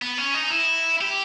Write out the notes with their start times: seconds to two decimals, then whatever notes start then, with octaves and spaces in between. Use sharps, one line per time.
0.02 B3
0.18 C#4
0.34 D#4
0.51 E4
1.01 G4